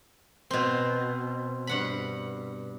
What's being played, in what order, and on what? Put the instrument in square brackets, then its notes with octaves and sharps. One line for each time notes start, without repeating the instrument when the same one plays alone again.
[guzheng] B2 C4
G2 F#5 B5